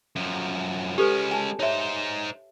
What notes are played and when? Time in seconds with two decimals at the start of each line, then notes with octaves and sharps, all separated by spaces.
0.16 F#2 F3
0.98 G#3 C#4 G4 A4 B4
1.31 G#5 A5
1.59 D#4 C5 C#5 E5